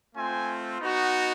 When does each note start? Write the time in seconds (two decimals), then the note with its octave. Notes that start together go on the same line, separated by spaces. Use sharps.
0.16 A3 C4 F4 G#5
0.80 B3 D#4 F#4